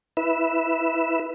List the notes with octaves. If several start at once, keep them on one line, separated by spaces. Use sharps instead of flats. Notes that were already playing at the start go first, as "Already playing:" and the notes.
E4 B4 E5